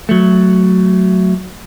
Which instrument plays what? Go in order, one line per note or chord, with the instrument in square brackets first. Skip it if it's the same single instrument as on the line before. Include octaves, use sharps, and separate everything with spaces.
[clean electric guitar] F#3 A3